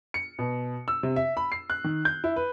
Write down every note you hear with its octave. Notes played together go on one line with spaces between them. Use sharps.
C#7
B2
E6
C3
E5
B5
C7
F#6
D#3
G6
E4
B4